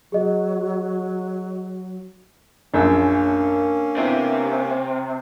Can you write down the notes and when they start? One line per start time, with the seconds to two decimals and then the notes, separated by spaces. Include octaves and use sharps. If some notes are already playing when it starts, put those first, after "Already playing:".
0.12 F#3 G#4 D#5
2.74 A#1 F#2 A#3 C#4 D4 A#4 E6
3.97 C3 B3 C4 E4